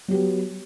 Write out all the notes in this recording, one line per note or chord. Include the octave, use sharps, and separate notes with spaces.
F#3 B3 G4